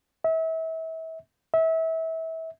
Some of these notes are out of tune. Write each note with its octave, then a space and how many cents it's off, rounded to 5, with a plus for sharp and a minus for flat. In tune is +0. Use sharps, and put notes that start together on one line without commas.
E5 -30
E5 -25